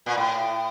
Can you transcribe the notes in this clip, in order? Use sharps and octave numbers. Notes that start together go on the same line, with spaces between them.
A#2
A2